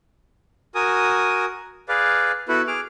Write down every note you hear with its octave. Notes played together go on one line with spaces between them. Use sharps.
F#4 A#4 G#5 D#6
G#4 B4 D5 F5
B3 E4 F#4 A4 B4
G#4 D6 F6